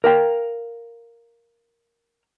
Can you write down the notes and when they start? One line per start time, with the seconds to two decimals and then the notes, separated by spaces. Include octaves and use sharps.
0.04 A#4 F5 G5